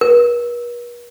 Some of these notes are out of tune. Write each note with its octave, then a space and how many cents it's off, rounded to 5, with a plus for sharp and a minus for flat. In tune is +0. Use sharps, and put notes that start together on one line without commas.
B4 -45